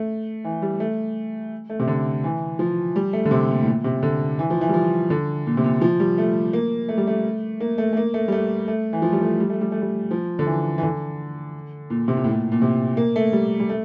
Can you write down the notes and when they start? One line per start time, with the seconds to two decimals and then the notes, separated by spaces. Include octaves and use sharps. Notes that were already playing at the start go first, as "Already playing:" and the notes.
Already playing: A3
0.45 E3
0.62 G3
0.80 A3
1.69 A3
1.79 C3
1.87 D3
2.24 E3
2.59 F3
2.96 G3
3.13 A3
3.25 D3
3.31 C3
3.49 A#2
3.62 A2
3.66 A#2
3.84 C3
4.03 D3
4.39 E3
4.50 F3
4.61 E3
4.69 G3
4.74 F3
5.10 D3
5.47 A#2
5.57 C3
5.64 A#2
5.81 F3
6.00 G3
6.18 A3
6.53 A#3
6.88 A3
6.98 G3
7.07 A3
7.60 A#3
7.78 A3
7.93 A3
7.97 A#3
8.14 A3
8.28 G3
8.32 A3
8.68 A3
8.93 E3
9.02 F3
9.12 G3
9.21 A3
9.40 G3
9.50 A3
9.61 G3
9.72 A3
9.81 G3
10.11 F3
10.39 D3
10.46 E3
10.78 E3
10.83 D3
11.90 A#2
12.08 C3
12.17 A#2
12.24 A2
12.33 A#2
12.52 A#2
12.62 C3
12.97 A#3
13.16 A3
13.33 G3
13.60 G3
13.69 A3